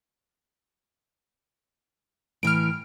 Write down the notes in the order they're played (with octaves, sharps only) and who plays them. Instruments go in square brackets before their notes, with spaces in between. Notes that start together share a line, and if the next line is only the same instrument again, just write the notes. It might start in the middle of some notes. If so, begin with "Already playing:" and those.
[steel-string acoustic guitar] A2 E3 [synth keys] F6 D7